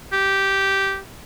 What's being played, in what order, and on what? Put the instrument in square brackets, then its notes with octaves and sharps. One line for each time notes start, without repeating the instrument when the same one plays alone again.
[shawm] G4